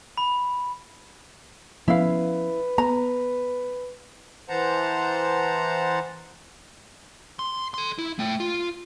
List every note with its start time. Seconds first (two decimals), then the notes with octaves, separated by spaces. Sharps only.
0.18 B5
1.88 F3 B3 C#4 E4 B4 F5
2.78 B3 A#5
4.49 E3 C5 F#5 A5 A#5
7.39 C6
7.74 A4 C6
7.98 E4
8.19 A3 G5
8.40 F4